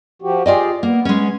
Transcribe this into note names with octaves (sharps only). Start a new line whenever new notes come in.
F3 F#4 G4
F4 G4 G#4 D5 D#5
A#3 B3
G#3 C#4